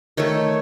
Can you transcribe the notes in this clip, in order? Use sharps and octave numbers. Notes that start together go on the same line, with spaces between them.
D#3 A3 C#5